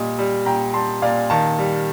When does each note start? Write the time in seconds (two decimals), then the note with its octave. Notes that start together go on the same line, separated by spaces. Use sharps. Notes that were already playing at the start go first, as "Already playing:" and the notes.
Already playing: A#2 G3 D#5
0.19 G3
0.46 A#2 G5 A#5
0.74 G3 A5 C6
1.02 A#2 D5 F5
1.30 D#3 F5 A5
1.59 G3